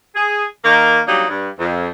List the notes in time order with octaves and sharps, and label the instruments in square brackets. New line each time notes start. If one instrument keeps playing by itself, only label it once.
[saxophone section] G#4
D#3 A#3
F#3 G3 A#3 D4 D#4
G2
F2